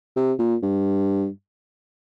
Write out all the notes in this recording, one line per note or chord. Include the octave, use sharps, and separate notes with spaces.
C3
A#2
G2